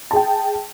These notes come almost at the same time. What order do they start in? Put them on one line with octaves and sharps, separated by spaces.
A5 G#4 G5